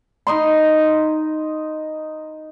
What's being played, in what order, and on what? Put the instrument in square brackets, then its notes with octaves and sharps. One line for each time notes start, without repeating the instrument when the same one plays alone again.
[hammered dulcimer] D#4 D#5 C6